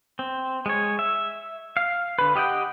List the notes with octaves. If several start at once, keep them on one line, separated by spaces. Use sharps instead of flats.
C4
G#3 C#5
E5
F5
D3 B4
G4 D#5 F#5 G5